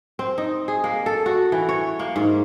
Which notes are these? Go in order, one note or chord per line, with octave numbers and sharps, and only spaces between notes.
C4
D#4
G#4
A#3
A4
F#4
E3
C#5
A#3
G#2